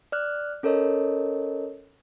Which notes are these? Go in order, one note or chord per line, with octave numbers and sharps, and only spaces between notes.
D5 F6 F#6
C#4 A4 A#4 C#5 D#5